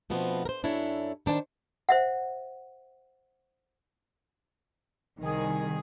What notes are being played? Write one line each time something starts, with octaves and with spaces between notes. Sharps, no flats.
B2 F3 A3 B3 C4 D4
A#4 C5
F#2 D4 E4 A4 C#5
D#3 D4 C5 G5 A5
C5 E5 F#5
C2 D#3 G#4